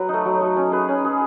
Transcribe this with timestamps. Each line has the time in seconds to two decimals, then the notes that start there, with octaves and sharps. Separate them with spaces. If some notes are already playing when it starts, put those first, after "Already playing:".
Already playing: F#3 B4
0.09 D#4
0.14 A3
0.25 F#3
0.40 A3 D#4
0.57 C#4
0.72 G#4 B4
0.89 C#4
1.05 G#4 B4